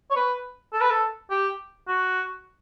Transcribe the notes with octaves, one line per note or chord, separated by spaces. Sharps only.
C#5
B4
A4
B4
A4
G4
F#4